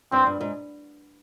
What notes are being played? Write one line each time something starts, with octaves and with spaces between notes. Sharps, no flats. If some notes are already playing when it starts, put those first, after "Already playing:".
G2 C4
G2
G#2